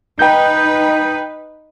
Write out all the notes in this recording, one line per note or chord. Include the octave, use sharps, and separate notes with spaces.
D#4 B4 G5 G6